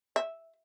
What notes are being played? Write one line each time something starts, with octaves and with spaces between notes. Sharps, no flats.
E5